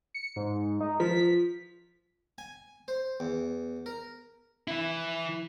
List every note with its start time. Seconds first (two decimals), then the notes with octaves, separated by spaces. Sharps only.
0.14 C#7
0.36 G#2
0.81 D#4
1.00 F3 B6
2.38 G#5
2.88 C5
3.20 E2
3.86 A#4
4.68 E3 E4